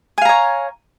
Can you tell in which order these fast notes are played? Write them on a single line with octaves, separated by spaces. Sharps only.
G#5 F5 A#5 C#5